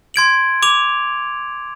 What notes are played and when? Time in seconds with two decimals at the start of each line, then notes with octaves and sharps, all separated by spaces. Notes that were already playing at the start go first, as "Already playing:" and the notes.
0.14 C6 G#6 D7 F#7
0.63 D6 F7